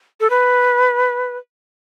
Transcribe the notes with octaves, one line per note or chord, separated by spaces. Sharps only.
A4
B4